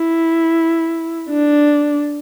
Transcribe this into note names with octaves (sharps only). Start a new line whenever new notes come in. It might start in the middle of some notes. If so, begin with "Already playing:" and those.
Already playing: E4
D4